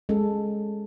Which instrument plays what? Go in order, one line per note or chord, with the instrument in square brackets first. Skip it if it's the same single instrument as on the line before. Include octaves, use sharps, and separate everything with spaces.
[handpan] G#3 C#4 A4